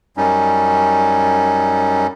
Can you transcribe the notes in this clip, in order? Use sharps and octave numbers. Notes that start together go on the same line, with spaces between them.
F#2 G3 C#4 D#4